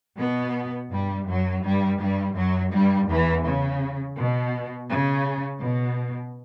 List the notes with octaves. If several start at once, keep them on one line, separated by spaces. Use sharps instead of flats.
B2 B3
G2 G3
F#2 F#3
G2 G3
G2 G3
F#2 F#3
G2 G3
E2 E3
C#3
B2
C#3
B2